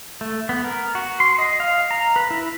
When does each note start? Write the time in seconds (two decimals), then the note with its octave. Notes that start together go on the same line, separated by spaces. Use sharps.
0.21 A3
0.49 B3
0.64 A#4
0.95 F#4
1.20 C6
1.38 D#5
1.60 F5
1.91 A#5
2.16 B4
2.31 E4